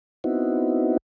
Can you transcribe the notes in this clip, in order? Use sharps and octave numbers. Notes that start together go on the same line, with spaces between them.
B3 C4 D#4 E4 F#4